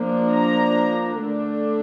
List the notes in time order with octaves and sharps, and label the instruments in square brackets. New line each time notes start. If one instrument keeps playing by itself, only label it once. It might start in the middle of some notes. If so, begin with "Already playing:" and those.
Already playing: [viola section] F3 A#3 D4
A#5
D3 A3 D4